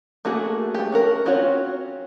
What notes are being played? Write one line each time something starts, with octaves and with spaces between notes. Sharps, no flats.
A3 A#3 F#4 G#4
A3 G4
C#4 F#4 A#4
C4 C#4 F4 F#4 C#5